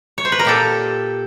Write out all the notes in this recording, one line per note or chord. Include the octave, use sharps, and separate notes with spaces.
C#5
C5
B4
A#4
A#2 G4 A4